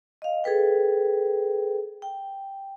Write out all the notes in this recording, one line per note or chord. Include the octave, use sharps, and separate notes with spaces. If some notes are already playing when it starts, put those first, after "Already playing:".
D#5 F5
G#4 A4 B4 G5
G5